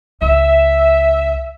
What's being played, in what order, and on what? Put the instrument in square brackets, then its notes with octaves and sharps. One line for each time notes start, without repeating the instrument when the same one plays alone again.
[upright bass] C#2 [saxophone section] E5